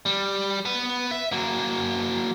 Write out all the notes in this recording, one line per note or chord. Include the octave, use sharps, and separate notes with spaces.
G3
B3 B4
E5
F#3 A#3